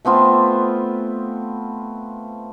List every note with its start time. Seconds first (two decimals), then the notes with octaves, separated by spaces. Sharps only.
0.05 A3 B3 C4 F4